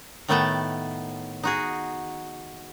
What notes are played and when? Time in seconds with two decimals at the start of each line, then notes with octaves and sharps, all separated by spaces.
0.28 A2 D#3 A3 B3 G5 A5
1.43 D#4 F#4 G#4